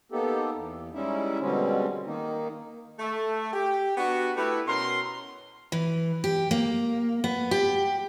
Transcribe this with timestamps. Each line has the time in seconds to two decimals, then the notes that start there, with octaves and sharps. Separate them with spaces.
0.12 A#3 B3 D#4 G4 A4
0.54 E2
0.94 G3 G#3 C#4 D#4 E4 E5
1.40 B2 D3 G3 G#3 C4 C#4
2.07 D#3 A#3 D#4
2.99 A3
3.53 G4
3.97 B3 D4 F#4
4.36 A3 E4 G4 B4
4.67 B2 C#4 A#4 C6
5.72 E3
6.24 G4
6.51 A#3
7.24 B3
7.51 G4